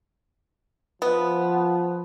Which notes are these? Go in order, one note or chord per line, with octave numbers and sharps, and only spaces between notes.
F3 B3